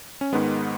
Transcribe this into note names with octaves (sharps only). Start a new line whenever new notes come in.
C#4
G#2 D#3 G#3 B3